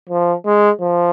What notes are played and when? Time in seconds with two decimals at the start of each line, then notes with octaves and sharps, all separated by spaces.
0.09 F3
0.45 G#3
0.81 F3